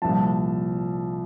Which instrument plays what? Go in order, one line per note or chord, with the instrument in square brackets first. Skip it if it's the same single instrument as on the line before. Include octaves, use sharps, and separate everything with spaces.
[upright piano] C2 A#2 F3 A5